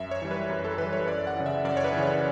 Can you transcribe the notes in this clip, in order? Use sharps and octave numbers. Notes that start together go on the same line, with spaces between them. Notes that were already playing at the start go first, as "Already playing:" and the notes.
Already playing: F#2 E5
C#5
E3 G3
B4
F#2
A4
E3 G3 B4
C#5
F#2 D5
F#5
C#3 E3
E5
F#2 D5
C#5
B4
C#3 E3
C#5